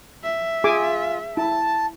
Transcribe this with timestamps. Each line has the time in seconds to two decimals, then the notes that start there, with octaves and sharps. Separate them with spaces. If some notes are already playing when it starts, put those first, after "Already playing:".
0.24 E5
0.64 F4 G#4 G#5 D6
1.37 E4 A5